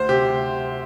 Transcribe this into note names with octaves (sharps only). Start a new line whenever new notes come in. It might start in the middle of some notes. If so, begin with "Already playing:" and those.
Already playing: D2 C5
C3 G4
C3